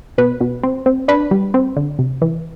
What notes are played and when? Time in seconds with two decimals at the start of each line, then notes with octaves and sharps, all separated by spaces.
0.18 B2 B4
0.41 B2
0.63 C4
0.86 C4
1.08 D4 B4
1.31 G3
1.54 C4
1.76 D3
1.99 C3
2.22 E3